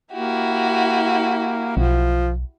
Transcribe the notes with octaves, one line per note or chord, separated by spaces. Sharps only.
A#3 E4 F#4 G4
B1 F3